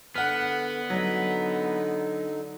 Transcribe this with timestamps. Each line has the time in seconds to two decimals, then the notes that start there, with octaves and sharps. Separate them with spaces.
0.16 D3 B3 F#5 F6
0.90 D3 F#3 D#4